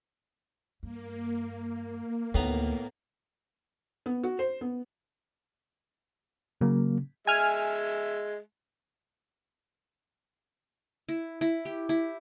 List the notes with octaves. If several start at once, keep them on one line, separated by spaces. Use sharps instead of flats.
G2 A#3
D2 A2 D#3 B3 A#5
B3
F#4
C5
B3
C#3 F#3 A#3
G#3 E5 G#5 F6
E4
E4
G4
E4